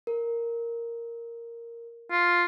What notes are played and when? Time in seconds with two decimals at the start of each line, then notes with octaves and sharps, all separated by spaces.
0.07 A#4
2.11 F4